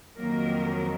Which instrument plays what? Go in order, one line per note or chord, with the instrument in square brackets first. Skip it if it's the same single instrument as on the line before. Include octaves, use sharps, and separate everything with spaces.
[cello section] F2 D#3 F#3 A#3 A#4